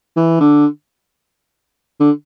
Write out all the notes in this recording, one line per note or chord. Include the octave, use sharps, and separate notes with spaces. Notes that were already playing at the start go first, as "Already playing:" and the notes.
E3
D3
D3